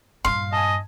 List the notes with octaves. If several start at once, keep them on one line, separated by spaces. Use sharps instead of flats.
G2 A#2 F5 C6
D#5 G#5 A5